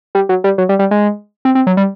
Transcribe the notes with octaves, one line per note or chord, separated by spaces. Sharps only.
G3
F#3
G3
F#3
G3
G3
G#3
C4
C4
F#3
G3